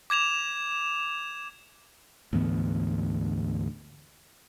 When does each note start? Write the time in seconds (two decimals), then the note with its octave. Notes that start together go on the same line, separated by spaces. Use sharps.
0.10 D6 G#6 E7 F7
2.33 D2 G#2 E3 B3